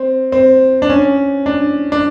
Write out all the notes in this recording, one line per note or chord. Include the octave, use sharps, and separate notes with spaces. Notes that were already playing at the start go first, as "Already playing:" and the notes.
Already playing: C4
C4
D4
C#4
D4
D4